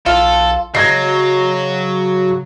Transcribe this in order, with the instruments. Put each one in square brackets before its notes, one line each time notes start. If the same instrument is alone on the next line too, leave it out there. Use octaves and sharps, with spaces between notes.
[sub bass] B1 [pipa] F4 [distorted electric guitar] A4
[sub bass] C#3 [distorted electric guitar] F#3 [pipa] G#3 [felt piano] G#6 A#6 C7